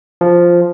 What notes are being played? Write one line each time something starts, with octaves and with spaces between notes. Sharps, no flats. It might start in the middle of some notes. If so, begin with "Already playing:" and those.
F3